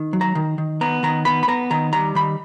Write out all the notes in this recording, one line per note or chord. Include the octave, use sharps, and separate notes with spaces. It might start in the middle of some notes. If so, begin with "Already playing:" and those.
Already playing: D#3
F#3
A#5
D#3
D#3
B3 A#5
D#3 A#5
B3 B5
B5
B3 A#5
D#3 A#5
G3 A#5
D#3 B5